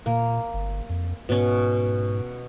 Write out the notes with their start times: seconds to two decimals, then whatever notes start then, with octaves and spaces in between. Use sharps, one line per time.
0.06 A#2 A#3
0.53 G1
0.89 F2
1.29 G#2 B2 C#4